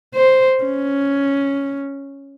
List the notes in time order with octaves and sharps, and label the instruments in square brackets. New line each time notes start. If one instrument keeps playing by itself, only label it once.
[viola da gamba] C5
C#4